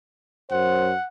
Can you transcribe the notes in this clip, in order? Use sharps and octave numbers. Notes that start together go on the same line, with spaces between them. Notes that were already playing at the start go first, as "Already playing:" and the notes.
F#2 C5 F#5